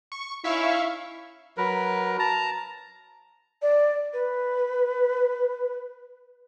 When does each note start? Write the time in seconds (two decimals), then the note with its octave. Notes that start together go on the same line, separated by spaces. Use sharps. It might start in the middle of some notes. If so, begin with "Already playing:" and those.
0.12 C#6
0.44 C#4 D#4 E4 E5 F5 C#6
1.57 F#3 A#4 B4
2.19 A5 A#5
3.62 D5
4.13 B4